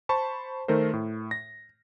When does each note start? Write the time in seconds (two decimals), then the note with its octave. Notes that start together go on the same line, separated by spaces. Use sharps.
0.09 C5 A5 B5 C#6
0.68 D#3 A3 A#4 C5
0.93 A2
1.31 A#6